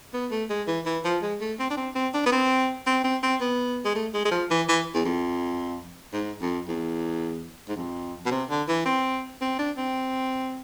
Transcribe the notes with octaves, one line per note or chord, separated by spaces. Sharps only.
B3
A3
G#3
E3
E3
F3
G#3
A3
C4
D4
C4
C4
D4
B3
C4
C4
C4
C4
B3
G#3
A3
G#3
G#3
F3
E3
E3
E2
F2
G#2
F2
E2
G#2
F2
B2
C3
D3
E3
C4
C4
D4
C4